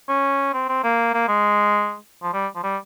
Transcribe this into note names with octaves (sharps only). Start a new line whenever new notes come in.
C#4
C4
C4
A#3
A#3
G#3
F3
G3
F3
G3